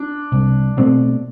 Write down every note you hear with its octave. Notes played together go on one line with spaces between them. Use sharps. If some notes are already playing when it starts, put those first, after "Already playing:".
Already playing: D4
C2
B2 A3 C4